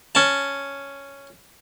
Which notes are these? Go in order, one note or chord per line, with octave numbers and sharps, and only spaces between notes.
C#4 A5